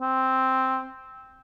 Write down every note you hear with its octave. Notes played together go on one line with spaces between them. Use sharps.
C4